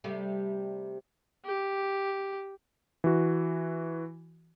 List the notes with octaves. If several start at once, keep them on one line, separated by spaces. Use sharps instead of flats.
C3 G3 A3
G4
E3 F#4